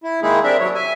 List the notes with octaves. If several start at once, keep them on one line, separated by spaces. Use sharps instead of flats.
E4
D#3 G#3 A#3 D#4 E4 G#4
G3 C4 D4 A#4 E5
C3 F#3 C#5
E5 G#5